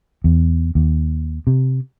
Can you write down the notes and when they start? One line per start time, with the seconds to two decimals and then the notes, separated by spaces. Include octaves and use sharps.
0.24 E2
0.75 D#2
1.47 C3